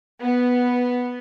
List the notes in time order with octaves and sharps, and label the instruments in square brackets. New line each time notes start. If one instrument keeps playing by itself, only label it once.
[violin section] B3